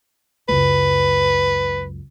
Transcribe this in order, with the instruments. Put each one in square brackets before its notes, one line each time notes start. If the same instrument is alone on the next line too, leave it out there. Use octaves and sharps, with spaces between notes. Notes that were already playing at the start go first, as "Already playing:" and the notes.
[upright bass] C#2 F#2 [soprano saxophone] B4